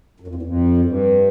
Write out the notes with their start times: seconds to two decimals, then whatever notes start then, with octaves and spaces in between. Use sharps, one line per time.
0.20 F#2
0.27 F2
0.35 E2
0.43 F2
0.77 F#2
0.85 G2